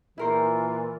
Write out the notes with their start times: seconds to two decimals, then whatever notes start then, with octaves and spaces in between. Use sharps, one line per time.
0.18 A#2 E3 E4 F4 A#4 C5